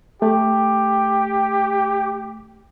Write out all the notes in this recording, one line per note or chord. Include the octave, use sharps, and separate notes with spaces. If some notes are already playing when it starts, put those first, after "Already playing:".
A3 G4